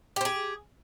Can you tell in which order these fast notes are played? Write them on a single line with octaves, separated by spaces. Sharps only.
G4 C5 G#4